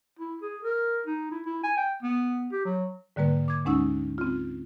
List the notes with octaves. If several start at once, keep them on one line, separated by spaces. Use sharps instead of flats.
E4
G#4
A#4
D#4
E4
E4
G#5
G5
B3
G4
F#3
G#2 D3 G3 A#3 B4
D6 G#6
D2 G#3 C#4 D#4 F#5 E6
C4 F4